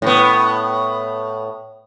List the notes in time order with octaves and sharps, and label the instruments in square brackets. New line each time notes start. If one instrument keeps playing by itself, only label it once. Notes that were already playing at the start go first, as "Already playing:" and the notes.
[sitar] A2 B3